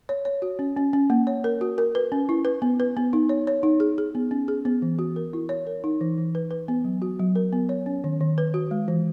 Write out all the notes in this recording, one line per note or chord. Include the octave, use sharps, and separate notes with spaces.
C#5
C#5
F#4
C#4
C#4
C#4
A#3
C#5
A#4
F#4
A#4
B4
C#4
E4
B4
B3
B4
B3
D#4
C#5
C#5
D#4
G#4
G#4
B3
C#4
G#4
B3
E3
F#4
A#4
E4
C#5
A#4
D#4
E3
E3
B4
B4
B3
F#3
F#4
F#3
A#4
B3
C#5
C#4
D#3
D#3
B4
F#4
G#3
E3